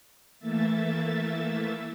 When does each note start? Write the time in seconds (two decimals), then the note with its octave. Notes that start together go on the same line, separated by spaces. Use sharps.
0.38 E3 A3 A#3 E5 A6